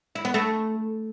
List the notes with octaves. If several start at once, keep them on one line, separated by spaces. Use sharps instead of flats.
E4
B3
A3